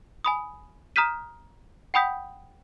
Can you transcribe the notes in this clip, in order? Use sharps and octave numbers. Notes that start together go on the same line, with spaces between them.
G#5 B5 D#6
A#5 D#6 F6 G6 B6 D#7
F#5 G5 B5 D#6 G6 B6